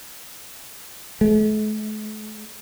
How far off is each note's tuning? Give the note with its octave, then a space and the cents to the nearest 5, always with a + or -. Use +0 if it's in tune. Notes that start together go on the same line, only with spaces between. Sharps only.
A3 -45